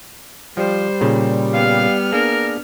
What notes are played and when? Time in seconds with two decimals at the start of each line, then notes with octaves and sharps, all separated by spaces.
0.57 F3 G3 C5
1.01 A#2 C#3
1.54 B3 F5 F6
2.12 A#3 D4 G#4 A#4